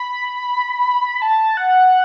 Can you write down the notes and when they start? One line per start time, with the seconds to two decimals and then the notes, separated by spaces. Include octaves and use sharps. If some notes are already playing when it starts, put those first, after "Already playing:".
Already playing: B5
1.22 A5
1.57 F#5